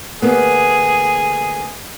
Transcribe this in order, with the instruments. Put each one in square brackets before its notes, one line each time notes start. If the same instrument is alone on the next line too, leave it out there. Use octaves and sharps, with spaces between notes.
[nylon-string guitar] D2 A#3 B3 [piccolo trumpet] G#4